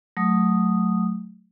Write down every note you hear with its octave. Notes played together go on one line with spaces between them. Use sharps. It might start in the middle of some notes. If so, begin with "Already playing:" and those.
F#3 A3 D#6